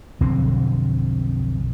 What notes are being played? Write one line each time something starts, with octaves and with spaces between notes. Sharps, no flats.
B1 F2 D3 C4